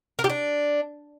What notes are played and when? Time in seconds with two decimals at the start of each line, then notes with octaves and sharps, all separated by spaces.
0.19 A#4
0.24 G4
0.29 D4